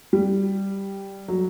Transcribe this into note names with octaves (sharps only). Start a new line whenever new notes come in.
G3
F#3